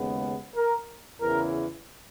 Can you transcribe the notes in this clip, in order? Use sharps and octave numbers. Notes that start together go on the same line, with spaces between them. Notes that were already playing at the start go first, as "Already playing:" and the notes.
Already playing: D#2 C#3 G#3 B3
A#4
E2 C#3 E3 A#4